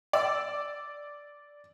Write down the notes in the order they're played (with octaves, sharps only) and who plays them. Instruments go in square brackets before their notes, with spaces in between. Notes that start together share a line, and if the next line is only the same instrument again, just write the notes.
[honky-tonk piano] D5 E6